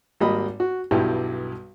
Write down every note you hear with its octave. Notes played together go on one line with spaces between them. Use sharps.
G#1 G3 A#3 D#5 B5
F#4
B1 G2 G3 E4 G4